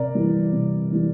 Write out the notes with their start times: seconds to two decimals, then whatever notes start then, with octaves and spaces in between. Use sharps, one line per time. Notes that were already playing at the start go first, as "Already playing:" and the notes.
Already playing: C3 A#4 D5
0.15 E3 G3
0.52 C3
0.91 E3 G3